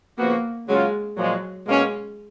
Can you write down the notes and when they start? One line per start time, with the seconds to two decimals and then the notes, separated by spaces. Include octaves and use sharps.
0.18 C#3 F3 A#3 B3 F#4
0.68 C#3 F#3 G#3 C#4 F4 G#4
1.17 A#2 F3 F#3 G#3
1.66 B2 G#3 A#3 C#4